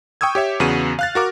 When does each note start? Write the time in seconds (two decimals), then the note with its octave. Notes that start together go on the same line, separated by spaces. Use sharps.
0.21 G5 C#6 D#6 E6 G#6
0.35 G4 C#5 E5
0.60 E2 C#3 B3 F#4 D#7
0.99 F5 F#6 A6
1.15 F#4 A#4 D6